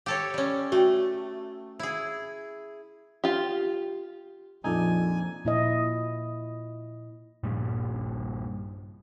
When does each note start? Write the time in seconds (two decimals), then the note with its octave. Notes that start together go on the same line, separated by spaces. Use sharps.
0.06 G4 A4 C#5
0.34 G3 C#4
0.72 A3 F#4 G5
1.79 E4 G#4
3.24 F4 G4
4.64 A#1 F2 A#2 F3 D#4 A4 D5 G#5
5.45 A#2 E4 D#5
7.43 G2 A#2 G3